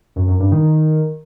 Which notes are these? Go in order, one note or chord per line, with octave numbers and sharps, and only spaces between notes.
F#2
F#2
G2
D#3